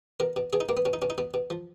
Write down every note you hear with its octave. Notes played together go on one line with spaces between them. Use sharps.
B2 A#4
B2
B2 G#4
D#4
B2 A#3
B3
B2 C#4
D#4
B2 C#4
D#4
B2 B3
B2
F3